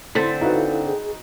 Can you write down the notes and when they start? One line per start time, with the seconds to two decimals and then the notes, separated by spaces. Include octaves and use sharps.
0.15 D3 C4 E4 C6 A6 B6
0.41 D#4 E4 F#4 A4 B4 F5
0.87 G#4